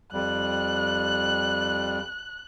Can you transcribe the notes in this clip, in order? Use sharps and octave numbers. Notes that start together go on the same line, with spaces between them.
F2 G3 F#6